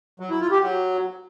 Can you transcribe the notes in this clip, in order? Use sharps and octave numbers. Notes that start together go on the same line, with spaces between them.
F#3
E4
F4
G4
F#3